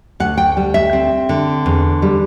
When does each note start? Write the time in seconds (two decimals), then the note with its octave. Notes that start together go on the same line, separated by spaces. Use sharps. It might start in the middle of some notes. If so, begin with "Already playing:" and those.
0.20 D2 F#5
0.38 G5
0.57 G3
0.74 E5
0.93 C4
1.29 D3
1.66 E2
2.02 G3